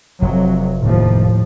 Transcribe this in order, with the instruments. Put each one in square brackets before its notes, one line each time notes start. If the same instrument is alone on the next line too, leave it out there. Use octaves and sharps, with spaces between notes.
[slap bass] F1 [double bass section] F2 F#3
[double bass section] D#2 F3 [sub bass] A2